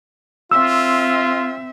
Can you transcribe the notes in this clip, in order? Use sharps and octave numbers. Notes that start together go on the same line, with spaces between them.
C4 F4 E5 E6